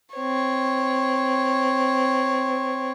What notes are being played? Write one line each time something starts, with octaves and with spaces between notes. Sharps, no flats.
C4 C#5